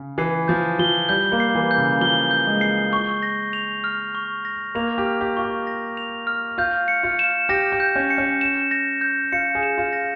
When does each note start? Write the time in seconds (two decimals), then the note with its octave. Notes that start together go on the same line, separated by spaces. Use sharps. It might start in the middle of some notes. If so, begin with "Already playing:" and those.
Already playing: C#3
0.18 E3 C7
0.48 F3 G6
0.79 F3 G7
1.09 G3 G6
1.32 A#3
1.40 C7
1.55 E3
1.71 G6
1.78 C#3
2.01 F3 G7
2.31 G6
2.46 G#3
2.61 C7
2.93 C#6
3.23 A#6
3.53 F7
3.84 F6
4.15 C#6
4.45 A#6
4.75 A#3 F7
4.98 G4
5.06 F6
5.21 G4
5.37 F4 C#6
5.44 G4
5.67 A#6
5.97 F7
6.27 F6
6.58 F4 G6
6.88 C#7
7.03 F4
7.19 E7
7.49 G4 A#6
7.72 G4
7.80 G6
7.96 C#4
8.10 C#7
8.18 C#4
8.41 E7
8.71 A#6
9.01 G6
9.32 F4 C#7
9.55 G#4
9.63 E7
9.78 F4
9.93 A#6